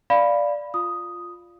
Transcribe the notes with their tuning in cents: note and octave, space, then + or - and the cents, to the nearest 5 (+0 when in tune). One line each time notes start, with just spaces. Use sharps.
D5 +0 F5 +0 B5 +0
F4 +0 D#6 +0